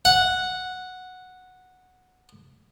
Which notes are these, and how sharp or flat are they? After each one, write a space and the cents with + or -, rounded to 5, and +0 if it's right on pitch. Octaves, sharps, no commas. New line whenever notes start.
F#5 -5